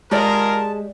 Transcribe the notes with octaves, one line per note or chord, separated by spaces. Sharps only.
G#3 F4 G4 G#4 A#4 D5 D#5 A5